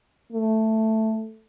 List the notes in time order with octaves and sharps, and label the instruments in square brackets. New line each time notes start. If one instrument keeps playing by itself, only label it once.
[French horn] A3